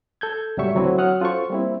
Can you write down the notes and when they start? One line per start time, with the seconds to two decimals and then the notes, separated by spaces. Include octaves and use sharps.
0.21 A4 G6 G#6
0.57 C#2 A2 F#3 G3 E5 C#6
0.75 D3 F#3 A3 C4 E4 B4
0.98 F#3 F#5 D#6 F6 F#6
1.20 C#4 F4 A4 C5 C#6
1.50 G3 A#3 C4 E4